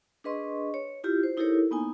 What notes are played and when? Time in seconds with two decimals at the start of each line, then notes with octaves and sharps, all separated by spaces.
0.24 D4 G#4 B4 D#5 C6 C#6
0.74 C#5
1.04 E4 F4 G4
1.23 C5
1.37 D#4 E4 G4 A4 A#4 C#5
1.71 A#3 B3 D#4 G#5